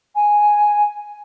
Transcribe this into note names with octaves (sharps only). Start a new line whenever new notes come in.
G#5